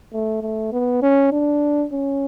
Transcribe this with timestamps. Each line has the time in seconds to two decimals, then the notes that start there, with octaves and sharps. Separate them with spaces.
0.13 A3
0.42 A3
0.72 B3
1.02 C#4
1.32 D4
1.92 C#4